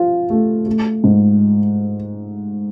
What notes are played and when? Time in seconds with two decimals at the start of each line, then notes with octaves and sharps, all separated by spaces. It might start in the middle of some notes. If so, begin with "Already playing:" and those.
Already playing: F3 F4
0.30 A3
0.66 A3
1.04 G#2